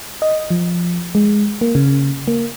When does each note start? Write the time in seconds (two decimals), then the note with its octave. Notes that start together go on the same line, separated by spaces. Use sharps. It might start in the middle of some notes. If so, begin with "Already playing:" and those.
0.22 D#5
0.50 F3
1.15 G#3
1.61 A#3
1.75 C#3
2.28 A#3